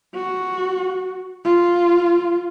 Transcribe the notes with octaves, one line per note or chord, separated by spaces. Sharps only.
F#4
F4